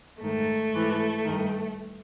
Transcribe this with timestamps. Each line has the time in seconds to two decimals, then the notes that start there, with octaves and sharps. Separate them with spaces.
0.21 G#2 D#3 A3
0.73 G#2 E3
1.24 G2 D#3